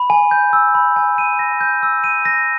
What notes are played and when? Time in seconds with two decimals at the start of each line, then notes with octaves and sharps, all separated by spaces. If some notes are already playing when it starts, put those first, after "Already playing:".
Already playing: B5
0.10 G#5
0.31 G6
0.53 E6
0.75 B5
0.96 G#5
1.18 D#7
1.39 A#6
1.61 G6
1.83 E6
2.04 D#7
2.25 A#6